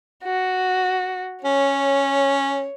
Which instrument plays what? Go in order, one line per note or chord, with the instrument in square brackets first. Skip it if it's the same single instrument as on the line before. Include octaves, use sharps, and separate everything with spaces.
[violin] F#4
[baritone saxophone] C#4 [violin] C#5